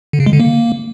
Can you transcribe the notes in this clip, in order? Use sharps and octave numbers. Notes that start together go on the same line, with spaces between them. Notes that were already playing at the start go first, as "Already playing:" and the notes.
D3
C#3
G#3
D3
A#3